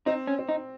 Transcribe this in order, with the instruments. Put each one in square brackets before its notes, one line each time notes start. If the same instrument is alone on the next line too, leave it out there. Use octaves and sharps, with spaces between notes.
[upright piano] C4 [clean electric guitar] D#4
[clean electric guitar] C#4
[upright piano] C4
[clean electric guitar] D#4